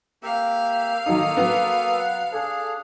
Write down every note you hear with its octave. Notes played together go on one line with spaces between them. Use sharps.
A#3 G4 E5 F5
D#3 F#3 A#3 D#4 A4 D#6
F#3 B3
F#5
D4 G#4 A4